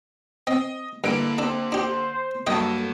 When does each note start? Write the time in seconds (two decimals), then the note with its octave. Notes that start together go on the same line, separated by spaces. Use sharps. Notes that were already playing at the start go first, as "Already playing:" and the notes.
0.47 C4 D#5
1.04 G2 D3 A#3 E4 D7
1.38 C3 D4 G4 A4 C5
1.72 D4 G4 C5
2.47 G2 F#3 A#3 A4 D#5 G5